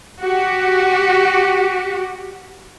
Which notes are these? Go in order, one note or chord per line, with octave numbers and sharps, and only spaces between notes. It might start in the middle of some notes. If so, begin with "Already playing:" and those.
F#4 G4